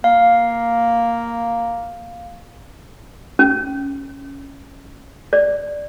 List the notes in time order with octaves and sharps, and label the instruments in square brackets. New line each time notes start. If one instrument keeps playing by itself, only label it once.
[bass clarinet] A#3 [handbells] F5
[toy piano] C#4
D5